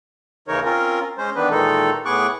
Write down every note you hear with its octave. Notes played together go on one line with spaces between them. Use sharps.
D#2 C#3 E3 D#4 A#4 C#5
C4 C#4 F4 A#4
G#3 C#4 C5
D#3 E3 B3 D4 B4
A#2 D#3 E3 G#3 D#4 A4
A2 B3 G#4 C#6 D6 F#6